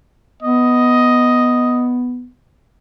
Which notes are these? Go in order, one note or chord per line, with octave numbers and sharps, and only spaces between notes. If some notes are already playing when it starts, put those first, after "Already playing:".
B3 D#5